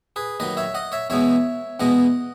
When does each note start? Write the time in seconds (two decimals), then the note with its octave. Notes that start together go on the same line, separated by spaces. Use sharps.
0.16 G#4 B4
0.40 D#2 D#3 F#3 B4 D#5
0.57 C#5 E5
0.74 D#5 F#5
0.92 C#5 E5
1.10 E2 B2 G#3 B3 C#5 E5
1.80 E2 B2 G#3 B3 D#5 F#5